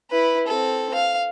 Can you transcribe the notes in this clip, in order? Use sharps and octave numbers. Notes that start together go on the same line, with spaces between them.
E4 B4
C4 A4
F5